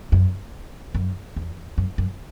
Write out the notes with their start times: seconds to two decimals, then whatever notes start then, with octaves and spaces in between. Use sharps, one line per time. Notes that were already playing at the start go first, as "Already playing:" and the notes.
0.12 F#2
0.95 F#2
1.36 E2
1.78 F#2
1.98 F#2